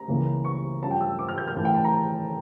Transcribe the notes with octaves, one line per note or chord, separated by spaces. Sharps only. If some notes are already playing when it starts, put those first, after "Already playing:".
Already playing: A#5
C#2 C#3 E3 A#3
C#6
G2 F3 C#4 A5
G5
E6
D6
F6
G6
F6
A2 E3 A3 A5
G5
A5
A#5